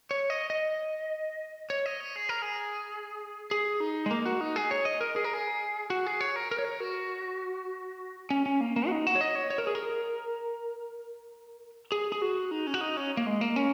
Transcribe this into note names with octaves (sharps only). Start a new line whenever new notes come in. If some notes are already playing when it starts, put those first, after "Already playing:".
C#5
D#5
D#5
C#5
D#5
C#5
G#4
A#4
G#4
G#4
D#4
G#3
A#3
F#4
D#4
G#4
C#5
D#5
A#4
G#4
A#4
G#4
F#4
G#4
C#5
A#4
A#4
C#5
A#4
F#4
C#4
C#4
A#3
A#3
F#4
D#4
F#4
C#5
D#5
C#5
C#5
A#4
G#4
A#4
G#4
G#4
F#4
D#4
C#4
F#4
D#4
C#4
A#3
G#3
A#3
C#4